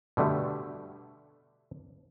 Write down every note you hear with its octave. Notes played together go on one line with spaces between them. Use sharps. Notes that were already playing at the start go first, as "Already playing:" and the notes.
B2 D3 G3 A3